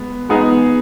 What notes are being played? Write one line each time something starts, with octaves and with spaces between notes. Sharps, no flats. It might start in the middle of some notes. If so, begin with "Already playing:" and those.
Already playing: G#3 B3
G#3 B3 D#4 G#4